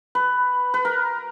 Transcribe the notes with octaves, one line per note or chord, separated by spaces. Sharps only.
B4
B4
A#4